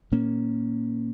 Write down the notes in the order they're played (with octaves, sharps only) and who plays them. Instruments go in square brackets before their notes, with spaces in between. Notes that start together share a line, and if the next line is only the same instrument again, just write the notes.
[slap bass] A#2 A#3 C#4